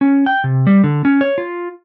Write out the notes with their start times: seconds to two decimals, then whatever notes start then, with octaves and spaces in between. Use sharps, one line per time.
0.01 C#4
0.26 G5
0.44 C3
0.67 G3
0.84 D3
1.05 C#4
1.21 C#5
1.38 F4